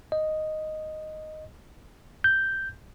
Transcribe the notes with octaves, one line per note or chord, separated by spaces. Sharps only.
D#5
G6